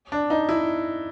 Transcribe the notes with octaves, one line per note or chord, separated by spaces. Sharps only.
D4
D#4
E4